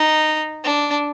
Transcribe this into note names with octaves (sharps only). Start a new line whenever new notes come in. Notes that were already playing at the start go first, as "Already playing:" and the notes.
Already playing: D#4
D4